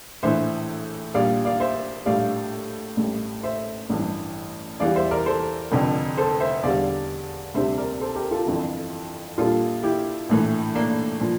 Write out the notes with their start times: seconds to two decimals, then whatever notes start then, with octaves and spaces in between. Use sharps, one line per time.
0.23 A#1 A2 E3 C5 E5
1.14 A#1 A#2 G3 D5 F5
1.45 D5 F5
1.60 C5 E5
2.06 A#1 A2 G3 D5 F5
2.97 A1 A2 G3
3.43 C5 E5
3.90 A1 G2 E3
4.80 E2 E3 G3 D5 F5
4.96 C5 E5
5.11 A#4 D5
5.26 A4 C5
5.72 F1 F2 D3
6.17 A4 C5
6.40 C5 E5
6.63 E2 D3 G3 D5 F5
7.54 D2 C3 G3 C5 E5
7.78 A#4 D5
8.00 A4 C5
8.15 G4 A#4
8.31 F4 A4
8.46 G1 F2 E3
9.38 A#1 A#2 G3 F4 A4
9.83 E4 G4
10.29 A#1 A2 E3
10.75 A#3 D4
11.20 A#2 F3